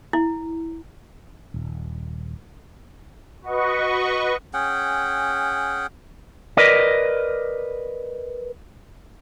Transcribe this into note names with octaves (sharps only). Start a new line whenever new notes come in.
E4
D#1
F#4 B4 D#5 C#6
C#4 G#4 F#5 G5
A#4 B4 D5 D#5